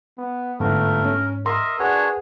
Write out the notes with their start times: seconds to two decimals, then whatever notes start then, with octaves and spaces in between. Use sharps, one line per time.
0.18 B3
0.60 G1 G#2 A3 A#4
1.04 C#4
1.46 A#4 D#5 E5 C6
1.79 D4 F#4 G#4 A#4 B4 C#5 F#5